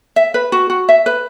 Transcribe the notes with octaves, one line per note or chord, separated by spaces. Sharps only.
E5
B4
F#4
F#4
E5
B4